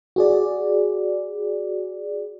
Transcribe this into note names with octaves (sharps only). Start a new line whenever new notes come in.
F#4 G#4 D5